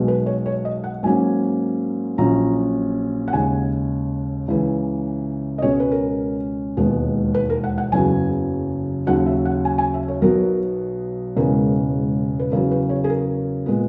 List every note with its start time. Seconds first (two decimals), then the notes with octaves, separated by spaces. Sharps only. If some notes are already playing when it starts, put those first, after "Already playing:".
Already playing: B1 B2 G#3
0.08 B4
0.26 C#5
0.46 C#5
0.65 D#5
0.84 F#5
1.03 G#2 F#3 A#3 C#4 G#5
2.18 A#1 A#2 F#3 C#4 A#5
3.28 F#5
3.33 D#2 C#3 G#3 G#5
4.48 C#2 C#3 E3
5.58 D#5
5.62 C#2 B2 G#3 C#4 C#5
5.80 B4
5.91 A#4
6.77 E1 D#2 D#3 G#3 B3
7.34 B4
7.50 A#4
7.64 F#5
7.78 F#5
7.92 F#1 E2 C#3 F#3 G#5
9.07 D#2 C#3 F#3 F#5
9.26 E5
9.45 F#5
9.65 G#5
9.78 G#5
9.94 E5
10.08 C#5
10.22 B1 B2 F#3 B3 A#4
11.36 E1 E2 C#3 G#3 A#4
12.39 B4
12.52 E2 C#3 F#3 A#4
12.71 B4
12.89 C#5
13.04 G#4
13.10 A#4
13.66 A#2 G#3 B3